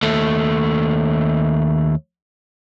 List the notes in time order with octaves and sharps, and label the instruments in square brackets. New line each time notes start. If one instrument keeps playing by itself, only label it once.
[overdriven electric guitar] D#2 A3